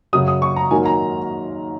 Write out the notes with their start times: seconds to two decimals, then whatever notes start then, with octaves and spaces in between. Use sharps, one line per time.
0.13 F#2 C#3 F#3 D#6
0.28 D#6
0.42 C#6
0.56 A#5
0.71 G#2 D#3 F#3 A#3 G#5
0.85 A#5